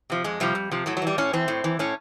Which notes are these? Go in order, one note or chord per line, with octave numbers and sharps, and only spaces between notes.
C3 F3
F2 G#3
C3 F3 G3
F2
C3 F3
A2 F#3
F#3
E3 G3
A2 C#4
E3 C4
A2
E3
A2 C#4